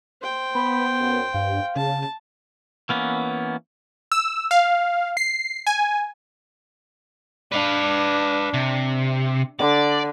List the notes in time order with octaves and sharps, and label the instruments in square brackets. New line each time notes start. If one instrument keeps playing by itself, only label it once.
[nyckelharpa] C5 G5
[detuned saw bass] B3 [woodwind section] B5
[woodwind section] F#2
[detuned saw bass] G2 [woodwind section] F5
[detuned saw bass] C#3 [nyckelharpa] A5
[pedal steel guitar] E3 A#3 B3 C#4
[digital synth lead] E6
F5
C7
G#5
[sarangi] D4 [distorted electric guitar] B4 F5
[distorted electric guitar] C3
[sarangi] D3 [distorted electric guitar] D5